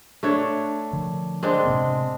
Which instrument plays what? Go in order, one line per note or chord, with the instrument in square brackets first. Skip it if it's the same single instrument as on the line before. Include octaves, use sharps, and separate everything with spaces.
[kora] A3 D4 C#5
[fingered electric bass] D3 F3
[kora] G#3 C4 D4
[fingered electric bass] A2 C3 B3